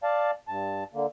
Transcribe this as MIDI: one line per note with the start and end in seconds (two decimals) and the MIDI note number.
0.03 0.31 74
0.03 0.31 77
0.03 0.31 81
0.48 0.84 43
0.48 0.84 81
0.94 1.06 50
0.94 1.06 58